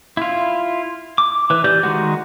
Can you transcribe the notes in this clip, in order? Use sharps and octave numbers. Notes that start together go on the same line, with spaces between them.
E4 F4
D6
E3 B4
E3 G4 D5 G6
D#3 F3 G#3 F#4